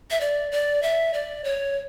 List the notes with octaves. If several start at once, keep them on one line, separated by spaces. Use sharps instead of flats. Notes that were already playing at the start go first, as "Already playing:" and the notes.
E5
D5
D5
E5
D5
C#5